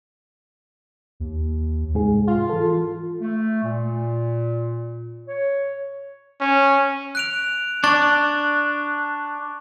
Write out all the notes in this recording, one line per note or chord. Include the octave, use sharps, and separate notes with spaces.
D#2
C2 G#2 G#4
F4
E3 A4
A3
A#2
C#5
C#4
F#6 D7 F7
D4 C#6 A6